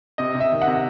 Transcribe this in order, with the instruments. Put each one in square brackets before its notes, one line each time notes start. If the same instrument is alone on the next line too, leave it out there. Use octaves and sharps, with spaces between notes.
[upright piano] C3 D#5
C3
E5
D#3
F#5
C3